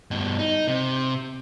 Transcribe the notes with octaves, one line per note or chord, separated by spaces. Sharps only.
G2 B2
D#4
C3